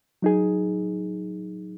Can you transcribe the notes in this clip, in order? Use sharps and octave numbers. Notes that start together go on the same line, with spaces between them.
F#3 D#4 G#4